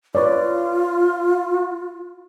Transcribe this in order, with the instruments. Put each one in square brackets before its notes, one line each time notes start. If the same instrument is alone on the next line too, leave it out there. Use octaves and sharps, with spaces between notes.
[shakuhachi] F4 [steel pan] B4 C#5 D5